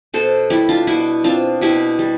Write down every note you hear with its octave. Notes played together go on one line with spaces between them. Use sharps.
B2 A4 C5
G3 E4 G4
D4 F4
B2 E4
C4 D4 F4
B2 E4 G4
G3